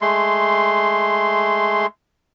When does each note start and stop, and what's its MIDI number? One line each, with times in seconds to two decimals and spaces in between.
0.01 1.86 56
0.01 1.86 57
0.01 1.86 84